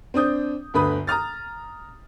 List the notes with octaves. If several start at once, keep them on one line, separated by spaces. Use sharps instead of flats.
C4 D4 D#6 G6
G1 D2 B4 B5 D#6
A#5 D#6 F6 A6